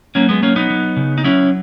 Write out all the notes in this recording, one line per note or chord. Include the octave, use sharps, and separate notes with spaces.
F#3 A#3 C#4
G#3 B3
F#3 A#3 C#4
B3 D#4
F#3
C#3
D#4
F#3 C#4 E4